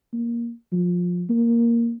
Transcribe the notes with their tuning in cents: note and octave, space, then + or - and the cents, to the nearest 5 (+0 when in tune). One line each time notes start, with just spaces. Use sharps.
A#3 +10
F3 +20
A#3 +0